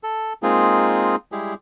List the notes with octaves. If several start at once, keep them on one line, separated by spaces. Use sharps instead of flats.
A4
G#3 A#3 C4 D#4 F4 G#4
G3 G#3 E4 G4 G#4